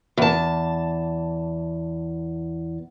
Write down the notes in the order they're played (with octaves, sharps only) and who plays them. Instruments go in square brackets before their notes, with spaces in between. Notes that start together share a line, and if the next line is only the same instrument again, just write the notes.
[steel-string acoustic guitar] E2 A5